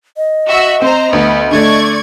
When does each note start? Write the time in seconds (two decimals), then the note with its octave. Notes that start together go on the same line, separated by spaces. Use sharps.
0.17 D#5
0.47 F#4 E5
0.82 C4 C5 A#5
1.13 D2 B3
1.51 D3 A3 D5 C#6 G#6